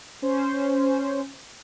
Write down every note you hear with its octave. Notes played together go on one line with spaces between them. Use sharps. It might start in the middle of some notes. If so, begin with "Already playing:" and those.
C#4 C5